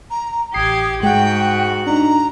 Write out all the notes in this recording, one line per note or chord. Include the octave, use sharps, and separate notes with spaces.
A#5
A1 G4 D#6 G#6 C7
G#2 G#3 F#4 F#5 G5 F#6
D4 D#4 A#5